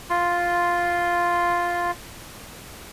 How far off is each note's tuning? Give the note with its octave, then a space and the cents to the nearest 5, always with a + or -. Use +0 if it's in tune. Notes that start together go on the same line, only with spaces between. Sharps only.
F4 +0 C6 +0